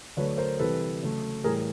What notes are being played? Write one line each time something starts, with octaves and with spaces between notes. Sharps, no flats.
D3 F#3 A3 B4 C#5
A#4 C5
C3 E3 G3 A4 B4
C#3 F#3 A3
A2 E3 G3 G#4 A#4